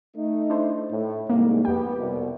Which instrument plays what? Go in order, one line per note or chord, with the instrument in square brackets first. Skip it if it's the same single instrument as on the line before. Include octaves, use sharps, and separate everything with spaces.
[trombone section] A3 D#4
[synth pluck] D4 E4 C5
[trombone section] A2
[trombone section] C2 G#2 [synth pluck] A#3
[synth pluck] F2 G5 [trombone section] B3 G4
[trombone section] C2 B2